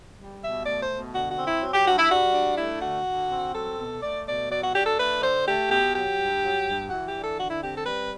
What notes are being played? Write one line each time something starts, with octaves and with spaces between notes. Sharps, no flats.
G3
B2 E5
A3 D5
C5
B2
D3 F#4
F#4
C4
E4
F#3
G4
G2 F#4
E4
G3 F#4
D4
A3 E4
D3 F#4
D3
C4
F#3 A4
B2
A3 D5
B2 D5
F#3 D5
F#4
D4 G4
A4
A3 B4
D3 C5
A3 G4
B2 G4
F#3 G4
G2
F#3
G2
E3 F#4
G4
D4
A4
D3 F#4
E4
C4 G4
A4
G3 B4